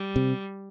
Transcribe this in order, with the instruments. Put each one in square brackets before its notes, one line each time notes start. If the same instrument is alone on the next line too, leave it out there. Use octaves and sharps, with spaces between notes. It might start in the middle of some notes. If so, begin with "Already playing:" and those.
Already playing: [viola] G3
[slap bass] C3